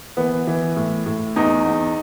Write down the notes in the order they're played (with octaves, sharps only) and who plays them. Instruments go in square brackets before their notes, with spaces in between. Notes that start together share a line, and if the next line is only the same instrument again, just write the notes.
[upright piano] E3 B3
E3
A2
A2
E2 D#4
E2